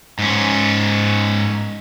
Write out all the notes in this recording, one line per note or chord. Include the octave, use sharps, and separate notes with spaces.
G#2 C#4